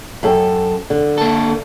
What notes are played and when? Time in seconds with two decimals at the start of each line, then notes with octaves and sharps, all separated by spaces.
0.23 F#2 A4 G5
0.90 D3
1.18 A#3 A4